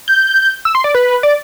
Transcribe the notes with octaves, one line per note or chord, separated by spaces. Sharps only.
G6
E6
C6
D5
B4
D5